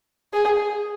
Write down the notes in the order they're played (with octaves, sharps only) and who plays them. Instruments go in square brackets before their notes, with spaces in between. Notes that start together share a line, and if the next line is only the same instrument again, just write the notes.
[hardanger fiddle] G#4